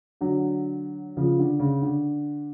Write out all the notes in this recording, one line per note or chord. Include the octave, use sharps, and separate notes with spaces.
D3 F#3
C#3 F3
D3
C#3
D3